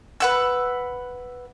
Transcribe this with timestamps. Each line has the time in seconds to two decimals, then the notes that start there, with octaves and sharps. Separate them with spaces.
0.20 B4 F#5 E6